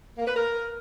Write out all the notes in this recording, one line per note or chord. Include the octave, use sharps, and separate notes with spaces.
A#3
B4
A#4